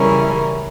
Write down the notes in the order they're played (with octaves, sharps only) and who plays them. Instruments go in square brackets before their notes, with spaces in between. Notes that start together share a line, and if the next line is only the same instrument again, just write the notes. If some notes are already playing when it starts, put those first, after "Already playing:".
Already playing: [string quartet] C#3 E3 G3 C#4 E4 A#4